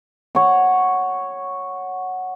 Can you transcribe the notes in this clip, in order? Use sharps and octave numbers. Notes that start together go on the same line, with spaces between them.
C#5 F#5